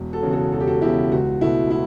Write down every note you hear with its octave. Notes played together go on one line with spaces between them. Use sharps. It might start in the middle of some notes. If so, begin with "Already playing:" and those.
Already playing: E1
F#4 A4
E2 C#3
F#4 A4
E1 A4
G4
F#4 A4
E2 C#3 E4 G4
C#2 F#4
B2 A3 E4
E4